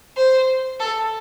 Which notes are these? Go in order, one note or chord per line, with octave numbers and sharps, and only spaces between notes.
C5
A4